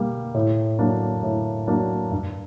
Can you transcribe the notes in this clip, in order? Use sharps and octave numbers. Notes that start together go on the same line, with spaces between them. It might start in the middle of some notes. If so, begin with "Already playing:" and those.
Already playing: B2 G3 A#3
A2
F#3 A#3 D4
A2
F#3 A#3 D4
G2